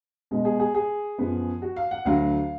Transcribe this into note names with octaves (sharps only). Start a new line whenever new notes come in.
B2 G#3 B3
G#4
G#4
G#4
F#2 F3 B3
F#4
F5
F#5
D2 D3 F#3 F5